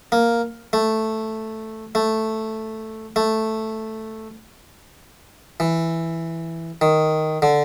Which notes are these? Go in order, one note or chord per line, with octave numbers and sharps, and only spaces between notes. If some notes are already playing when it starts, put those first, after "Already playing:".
A#3
A3
A3
A3
E3
D#3
D3